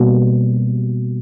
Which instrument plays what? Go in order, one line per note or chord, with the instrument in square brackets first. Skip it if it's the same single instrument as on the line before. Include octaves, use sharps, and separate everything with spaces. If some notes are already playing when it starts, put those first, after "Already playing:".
Already playing: [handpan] B2 G3 A#3